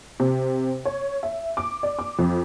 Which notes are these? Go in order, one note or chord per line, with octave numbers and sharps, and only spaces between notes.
C3
C#5
E5
D6
D5
D6
F2